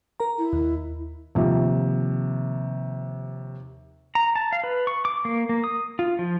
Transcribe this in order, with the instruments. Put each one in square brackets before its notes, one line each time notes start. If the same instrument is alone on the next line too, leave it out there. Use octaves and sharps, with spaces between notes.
[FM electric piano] A#4 A#5
[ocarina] E4
[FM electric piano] D#2
[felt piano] D#2 C3 F3
[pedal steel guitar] A#5
A5
F5
B4
C#6
D6
A#3
A#3
D#6
F4
F3